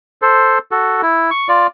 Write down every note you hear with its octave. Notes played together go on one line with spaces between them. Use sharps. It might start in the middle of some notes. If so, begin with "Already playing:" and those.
A4 C5
F#4 A4
E4
C#6
F4 D5